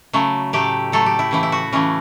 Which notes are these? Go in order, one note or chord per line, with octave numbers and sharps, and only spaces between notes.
C#3 F#3 A3
A2 F#3 A3 G4
A2 F#3 A3 A4
G4
E4
C#3 E3 A3 E4
E4
F#4
C#3 E3 A3 C#4